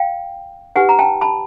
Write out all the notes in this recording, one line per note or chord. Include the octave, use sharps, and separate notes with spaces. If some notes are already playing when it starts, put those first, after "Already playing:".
Already playing: F5 G5
D#4 G4 B4 F#5 G#5
A#5
G5 A5
A5 B5